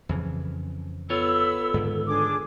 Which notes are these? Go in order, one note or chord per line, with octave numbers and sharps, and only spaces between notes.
F2 C#3 E3
B3 F4 A4 C#5 B5 E6
G#2 D3 D#3
D4 G#4 D6